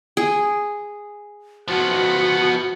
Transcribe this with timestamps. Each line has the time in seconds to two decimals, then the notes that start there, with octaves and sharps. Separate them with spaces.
0.17 G#4
1.68 F3 B3 F#4 F#5